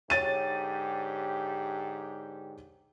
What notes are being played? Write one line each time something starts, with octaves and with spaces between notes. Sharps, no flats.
G#2 D3 G4 C#5 A6 D#7